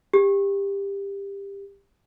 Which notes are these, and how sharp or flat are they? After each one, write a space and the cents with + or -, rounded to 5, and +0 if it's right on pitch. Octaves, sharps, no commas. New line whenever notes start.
G4 +20